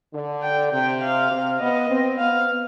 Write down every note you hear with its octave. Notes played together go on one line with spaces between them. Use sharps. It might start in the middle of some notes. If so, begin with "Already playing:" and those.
D3
G5
C3 G5
F5
C3
B3 D#5
C4
B3 F5